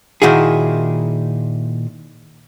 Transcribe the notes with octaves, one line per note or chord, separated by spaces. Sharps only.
A#2 D#3 E4 F#4 G#4